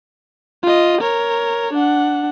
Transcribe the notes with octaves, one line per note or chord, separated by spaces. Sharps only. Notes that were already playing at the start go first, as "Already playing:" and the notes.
F4 D#5
A#4 C#5
D4 F#5